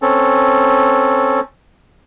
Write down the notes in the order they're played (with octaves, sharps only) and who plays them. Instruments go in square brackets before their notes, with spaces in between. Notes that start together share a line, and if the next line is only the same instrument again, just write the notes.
[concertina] C4 C#4 A4